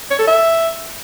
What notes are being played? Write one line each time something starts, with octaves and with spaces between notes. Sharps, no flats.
C#5
A4
E5